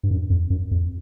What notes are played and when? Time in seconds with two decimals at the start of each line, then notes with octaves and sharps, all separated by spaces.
0.03 G2
0.11 F#2
0.30 F2
0.50 F#2
0.71 F2